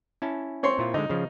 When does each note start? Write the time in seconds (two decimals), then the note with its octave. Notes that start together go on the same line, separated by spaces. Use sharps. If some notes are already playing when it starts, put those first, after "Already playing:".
0.22 C#4 E4 A5
0.63 C4 C#5 C6
0.78 A#2 E4 F4
0.94 D3 G#3 D#4
1.09 C#3 F3